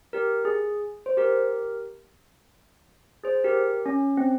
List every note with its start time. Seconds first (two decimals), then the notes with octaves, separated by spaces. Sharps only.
0.13 G4 A#4
0.45 G#4
1.06 C5
1.17 G4 A#4
3.24 G#4 C5
3.44 G4 A#4
3.86 C#4
4.17 C4